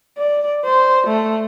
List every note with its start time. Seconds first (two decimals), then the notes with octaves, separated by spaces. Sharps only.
0.18 D5
0.65 C5
1.07 A3